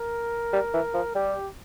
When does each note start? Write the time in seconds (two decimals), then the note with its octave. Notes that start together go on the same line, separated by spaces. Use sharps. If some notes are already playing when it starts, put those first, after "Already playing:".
Already playing: A#4
0.53 G3
0.74 E3
0.94 F3
1.15 G3 G4